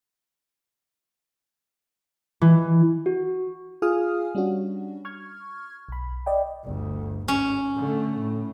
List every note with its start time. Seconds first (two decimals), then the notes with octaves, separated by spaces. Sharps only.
2.41 E3
3.06 F#4
3.82 F4 G#4 F5 G#5 D#6 F6
4.35 G3 C#4 D4 F#4
5.05 C#6 F6 G#6
5.89 B1 B5
6.26 D5 D#5 G5
6.64 G1 D2
7.28 G#1 C#4
7.76 D3 A3
8.20 A2